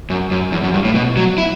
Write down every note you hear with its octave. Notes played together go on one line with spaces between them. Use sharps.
F#2
F#2
E2
F#2
G2
A2
B2
F#3
E4